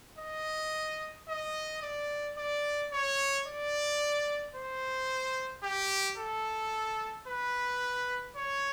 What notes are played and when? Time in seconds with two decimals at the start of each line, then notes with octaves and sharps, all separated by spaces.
0.19 D#5
1.28 D#5
1.82 D5
2.37 D5
2.92 C#5
3.46 D5
4.55 C5
5.63 G4
6.18 A4
7.28 B4
8.36 C#5